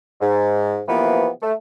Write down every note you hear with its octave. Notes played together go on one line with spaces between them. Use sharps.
G#2
C3 E3 F3 A#3 B3
A3